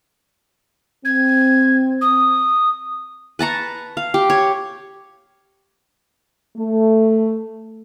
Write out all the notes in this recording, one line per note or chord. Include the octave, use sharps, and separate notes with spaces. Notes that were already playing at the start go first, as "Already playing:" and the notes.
C4 G#6
D#6
B4 A5 A#5 C#6
F5
G4
C#5
A3